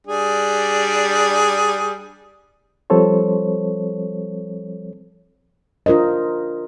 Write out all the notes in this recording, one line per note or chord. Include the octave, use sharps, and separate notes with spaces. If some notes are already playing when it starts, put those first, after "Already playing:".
G3 D4 G#4
F3 G3 C4 A4 C5 C#5
D4 F4 A#4 C5 D#5